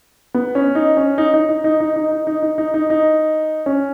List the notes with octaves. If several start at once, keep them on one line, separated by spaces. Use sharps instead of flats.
B3
C#4
D#4
C#4
D#4
D#4
D#4
D#4
D#4
D#4
D#4
D#4
D#4
D#4
D#4
D#4
C#4